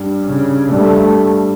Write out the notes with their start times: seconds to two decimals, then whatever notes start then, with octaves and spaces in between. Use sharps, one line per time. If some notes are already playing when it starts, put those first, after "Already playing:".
Already playing: G2 G3
0.25 C#3
0.72 G2 G3 A3